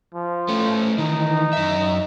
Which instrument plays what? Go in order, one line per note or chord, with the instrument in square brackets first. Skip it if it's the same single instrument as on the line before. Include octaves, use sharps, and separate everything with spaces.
[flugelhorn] F3
[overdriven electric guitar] A3 C#4
[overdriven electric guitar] D#3 E3 [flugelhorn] D#4
[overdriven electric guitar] F#2 E5